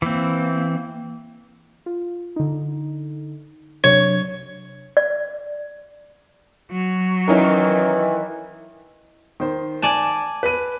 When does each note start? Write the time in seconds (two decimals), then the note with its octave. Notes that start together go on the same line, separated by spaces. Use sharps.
0.02 E3 A#3 C4
1.86 F4
2.36 D3 D#4
3.84 C3 F#3 D4 C#5
4.97 D5
6.71 F#3
7.28 D#3 E3 C#4 D#4 A#4
9.40 D#3 C5
9.82 D5 G#5 A5
10.43 B4 D#7